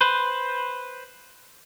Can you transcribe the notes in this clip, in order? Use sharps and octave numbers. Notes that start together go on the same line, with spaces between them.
B4 C5